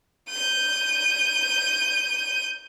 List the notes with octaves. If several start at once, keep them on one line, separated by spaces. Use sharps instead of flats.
G6 D#7